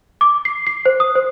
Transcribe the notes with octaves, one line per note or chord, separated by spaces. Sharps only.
D6
C7
C7
C5
D#6
C5